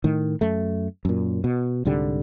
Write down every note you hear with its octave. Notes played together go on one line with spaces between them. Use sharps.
A2 D#3
F#2 A3
F#2 A#2
B2
C2 G#2 D3 G3